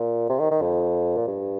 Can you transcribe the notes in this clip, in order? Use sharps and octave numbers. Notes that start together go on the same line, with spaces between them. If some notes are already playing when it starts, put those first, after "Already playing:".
Already playing: A#2
C3
D#3
D#3
F2
A#2
G2